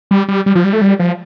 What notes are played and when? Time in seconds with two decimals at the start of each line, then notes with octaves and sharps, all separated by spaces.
0.11 G3
0.28 G3
0.46 G3
0.55 F3
0.64 G3
0.73 A3
0.81 G3
0.99 F3